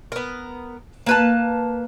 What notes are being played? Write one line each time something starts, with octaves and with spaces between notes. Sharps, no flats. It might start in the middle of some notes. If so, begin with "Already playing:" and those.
B3 A#4
A#3 B4 A5